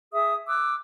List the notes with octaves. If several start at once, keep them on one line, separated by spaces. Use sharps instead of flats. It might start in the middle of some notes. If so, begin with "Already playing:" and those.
G#4 E5 D#6
D6 E6 F#6